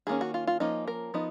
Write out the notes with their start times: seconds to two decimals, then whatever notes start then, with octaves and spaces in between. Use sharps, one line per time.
0.07 D#3 A#3 C#4 G#4
0.21 F#4
0.34 F4
0.47 F4
0.60 F3 A#3 C#4 D#4
0.88 A#4
1.14 F3 B3 D#4